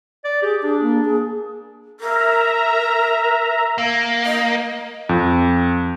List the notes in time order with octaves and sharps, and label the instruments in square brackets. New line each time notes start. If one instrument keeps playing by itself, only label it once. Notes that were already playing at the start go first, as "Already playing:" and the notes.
[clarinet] D5
[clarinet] G4 [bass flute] G#4
[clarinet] D4 [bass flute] G#4
[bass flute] A#3
G#4
[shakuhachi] A#4 [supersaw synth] E5 A#5
[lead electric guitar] A#3
[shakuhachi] D#5
[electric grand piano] F2